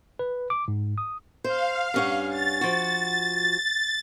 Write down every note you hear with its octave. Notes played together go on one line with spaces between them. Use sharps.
B4
D6
G#2
D#6
C5 F5
G2 C#4 F#5
A6
F3 F#4